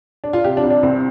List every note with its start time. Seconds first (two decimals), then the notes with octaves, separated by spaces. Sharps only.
0.24 D4
0.33 F4
0.44 C3 G4
0.57 D4
0.64 C2
0.70 D4
0.83 C2 C4